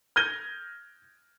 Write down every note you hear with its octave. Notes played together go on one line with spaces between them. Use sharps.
F6 G6 G#6 A#6 D#7 G7